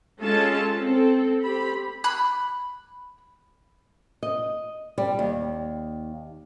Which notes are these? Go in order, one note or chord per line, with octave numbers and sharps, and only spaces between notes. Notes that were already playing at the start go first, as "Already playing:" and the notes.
G#3 C#4 F4 A4 A5
C4 A4
C4 G4 B5
B5 F#6
D#5
G3
D#2